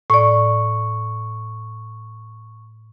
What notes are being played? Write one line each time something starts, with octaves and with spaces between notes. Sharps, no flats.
A2 D5 C#6